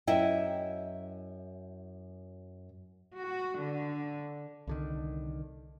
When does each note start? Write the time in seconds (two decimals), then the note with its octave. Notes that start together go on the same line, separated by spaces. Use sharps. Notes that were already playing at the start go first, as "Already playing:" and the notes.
0.07 F#2 E4 D#5 E5 G5
3.16 F#4
3.60 D3
4.67 C2 D3 D#3